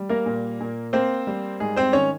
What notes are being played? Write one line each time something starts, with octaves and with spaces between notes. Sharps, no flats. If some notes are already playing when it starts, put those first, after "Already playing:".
Already playing: G3
A#3 A#4
A#2
A#2
A#3 C4 C5
G3
G#2 G#4
C4 C5
D#3 C#4 C#5